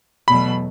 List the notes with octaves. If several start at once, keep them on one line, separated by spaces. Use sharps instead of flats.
E2 B2 F#3 A3 B5